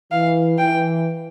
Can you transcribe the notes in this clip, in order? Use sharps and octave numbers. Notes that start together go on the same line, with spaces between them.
E3 F5
E3 G5